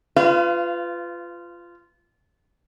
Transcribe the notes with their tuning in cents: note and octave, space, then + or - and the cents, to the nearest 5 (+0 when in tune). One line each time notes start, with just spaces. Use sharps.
F4 -10 B4 +30 F5 -35